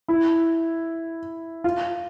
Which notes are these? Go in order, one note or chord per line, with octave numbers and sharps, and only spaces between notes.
E4
F4